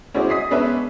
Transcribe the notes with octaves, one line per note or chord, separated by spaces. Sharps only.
C#4 E4 F#4 G#4 C5 D5
D#5 D#6 B6 C7
G#3 B3 C#4 D4 B4 E5